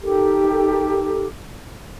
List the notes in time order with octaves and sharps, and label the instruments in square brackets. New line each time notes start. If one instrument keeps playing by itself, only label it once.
[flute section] D#4 G4 A4 A#4